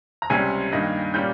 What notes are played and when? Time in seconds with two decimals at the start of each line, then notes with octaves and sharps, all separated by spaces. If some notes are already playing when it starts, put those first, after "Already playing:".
0.22 A#5
0.30 C#2 C3 G3 C#4 G#5
0.72 G2 D#3 A#3 D#4
1.14 A#2 G3 A#3 C#4 G6